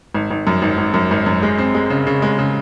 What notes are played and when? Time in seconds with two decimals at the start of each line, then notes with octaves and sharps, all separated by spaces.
0.14 G#1
0.31 G#1
0.47 F#2
0.62 G#1
0.78 G#1
0.94 F#2
1.11 G#1
1.26 F#2
1.43 G#3
1.58 C4
1.75 G#3
1.90 C#3
2.07 C#3
2.22 G#3
2.39 C#3